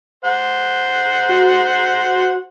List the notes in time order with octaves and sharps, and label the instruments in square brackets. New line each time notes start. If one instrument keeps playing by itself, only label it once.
[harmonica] C5 F#5
[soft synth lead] F#4